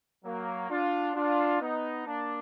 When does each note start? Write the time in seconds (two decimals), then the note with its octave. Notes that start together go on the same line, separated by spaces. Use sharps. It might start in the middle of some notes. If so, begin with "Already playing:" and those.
0.24 F#3 A#3
0.70 D4 F4
1.15 D4 F4
1.60 B3 D#4
2.06 A#3 D4